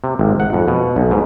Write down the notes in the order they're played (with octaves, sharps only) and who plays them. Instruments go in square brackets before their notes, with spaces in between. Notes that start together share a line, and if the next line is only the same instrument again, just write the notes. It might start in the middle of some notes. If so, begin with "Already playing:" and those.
[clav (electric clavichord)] C3
G#1
F#5
F2
B2
B1
G#2